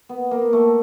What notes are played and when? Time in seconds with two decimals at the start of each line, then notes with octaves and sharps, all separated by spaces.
0.09 B3
0.31 A#3
0.53 A3